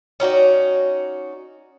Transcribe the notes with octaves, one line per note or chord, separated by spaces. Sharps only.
C#4 D#4 F#4 D5